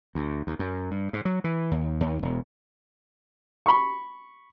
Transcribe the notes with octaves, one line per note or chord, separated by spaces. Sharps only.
D2
D#2
F#2
G2
G#2
F#3
E3
D#2
D#2
E1
B5 C#6